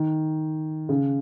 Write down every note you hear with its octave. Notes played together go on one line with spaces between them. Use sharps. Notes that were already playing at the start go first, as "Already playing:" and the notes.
Already playing: D#3
C#3